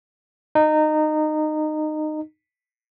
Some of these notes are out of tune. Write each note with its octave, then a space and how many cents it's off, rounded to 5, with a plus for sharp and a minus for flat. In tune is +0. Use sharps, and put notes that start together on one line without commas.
D#4 -20